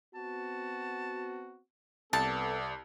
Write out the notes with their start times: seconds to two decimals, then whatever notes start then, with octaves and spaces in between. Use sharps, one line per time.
0.15 B3 C4 F#4 A5
2.13 C2 B3 A4 D5 A5